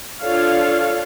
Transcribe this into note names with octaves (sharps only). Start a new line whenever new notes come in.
D4 F4 A4 C#5 F5